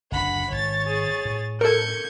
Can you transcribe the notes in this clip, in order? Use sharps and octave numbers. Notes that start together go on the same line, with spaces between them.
F#1 D2 D4 F#5 B5
G#1 D#3 C#5 A6
G#4
A2
A4 A#4 G6 G#6 C#7